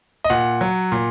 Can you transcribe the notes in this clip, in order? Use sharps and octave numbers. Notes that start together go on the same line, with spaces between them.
D#5
A#2 F#5
F#3
A#2